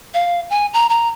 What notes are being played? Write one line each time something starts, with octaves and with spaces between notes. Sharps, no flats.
F5
G#5
A#5
A#5